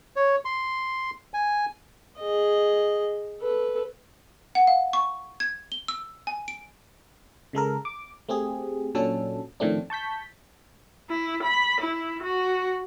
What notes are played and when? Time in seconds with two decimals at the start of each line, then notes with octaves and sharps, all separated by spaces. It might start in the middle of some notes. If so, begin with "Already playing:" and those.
0.16 C#5
0.45 C6
1.34 G#5
2.18 G#4 D#5
3.41 A4 B4
4.55 F#5
4.67 F5
4.93 C#6
5.40 G#6
5.72 G7
5.88 E6
6.27 G#5
6.48 D7
7.53 C#3 G#3 A4 A#4
7.85 D6
8.29 A3 C4 G4 G#4
8.95 A#2 F#3 C#4 D4 A4
9.60 A2 D#3 F3 A3 C4 D4
9.90 A5 C#6 G6 B6
11.10 E4
11.43 B5
11.81 E4
12.23 F#4